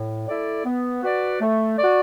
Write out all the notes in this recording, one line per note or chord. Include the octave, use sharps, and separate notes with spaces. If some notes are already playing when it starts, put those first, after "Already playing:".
Already playing: A2
A3 E4 A4 D5
B3
F#4 B4 D5
A3
F#4 D5